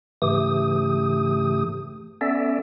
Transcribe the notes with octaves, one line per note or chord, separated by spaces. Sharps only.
G#2 C#3 E3 A3 G4 D#6
B3 C#4 A4 D5 E5